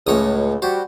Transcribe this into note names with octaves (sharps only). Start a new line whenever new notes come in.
C#2 A2 C#5 D#6
G3 F#4 C5